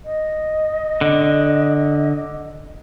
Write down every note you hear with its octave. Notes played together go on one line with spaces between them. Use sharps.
D#5
D3